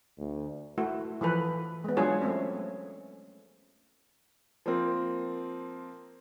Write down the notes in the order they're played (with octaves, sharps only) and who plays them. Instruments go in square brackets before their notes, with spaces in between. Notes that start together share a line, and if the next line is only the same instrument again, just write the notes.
[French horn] D2
[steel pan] A3 E4 F#4
E3 F3 A4 B4
G#3 B3
F#3 G#3 D4 F4 G#4 C#5
A3 C4 C#4
[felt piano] F3 A#3 C4